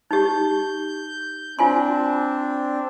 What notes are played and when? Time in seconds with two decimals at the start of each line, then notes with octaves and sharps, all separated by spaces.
0.11 D#4 G4 G6
1.59 C4 D4 F4 G#5 C6